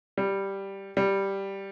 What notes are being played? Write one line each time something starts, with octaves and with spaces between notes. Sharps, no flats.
G3
G3